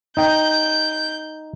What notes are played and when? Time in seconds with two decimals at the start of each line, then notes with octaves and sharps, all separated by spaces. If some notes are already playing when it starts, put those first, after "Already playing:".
0.17 D#4 G5 G6